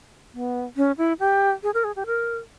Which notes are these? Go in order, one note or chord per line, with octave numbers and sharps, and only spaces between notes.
B3
C#4
E4
G4
G#4
A#4
G#4
G4
A#4